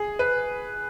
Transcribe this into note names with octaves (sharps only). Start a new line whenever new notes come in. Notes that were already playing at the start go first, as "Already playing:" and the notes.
Already playing: G#4
B4